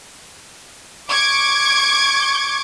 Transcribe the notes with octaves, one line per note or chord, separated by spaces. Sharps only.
C#6 D6 G#6 D7